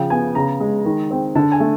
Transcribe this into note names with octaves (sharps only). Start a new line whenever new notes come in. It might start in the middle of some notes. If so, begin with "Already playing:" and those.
Already playing: C#3 F3 G5
B3 G#5
C#3 A#5
G#3
D#3
C4
D3 A5
G#5
A3